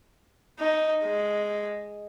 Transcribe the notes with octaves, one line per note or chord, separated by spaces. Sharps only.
D#4
G#3